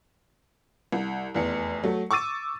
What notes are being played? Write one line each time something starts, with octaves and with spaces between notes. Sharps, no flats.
C2
F1 E2 C#7
F#3 A3
C#6 D6 E6 A6 D#7